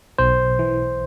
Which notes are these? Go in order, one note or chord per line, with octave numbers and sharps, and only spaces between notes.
B1 C5
E3